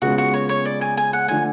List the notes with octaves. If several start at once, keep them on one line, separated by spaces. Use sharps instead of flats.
C#3 G#3 B3 F4 F#4
F#4
C#5
C#5
D5
G#5
G#5
F#5
D3 F3 A3 D4 G#5